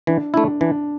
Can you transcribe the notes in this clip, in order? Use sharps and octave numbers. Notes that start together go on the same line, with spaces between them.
E3 D4
A3 D4 E4
E3 D4